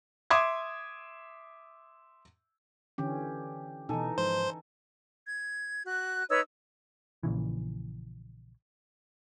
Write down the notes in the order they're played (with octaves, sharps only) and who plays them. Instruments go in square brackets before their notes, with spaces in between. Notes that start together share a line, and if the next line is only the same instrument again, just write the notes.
[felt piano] E5 C6 D6 D#6 G#6
[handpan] D3 E3 C#4 [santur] G4
[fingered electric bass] B2 [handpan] E3 D#4 [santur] A4 G#5
[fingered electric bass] G#2 F3 [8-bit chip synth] C5
[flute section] G#6
F#4 F#6
D#4 B4 C#5 E6
[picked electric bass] A#1 A#2 C#3 E3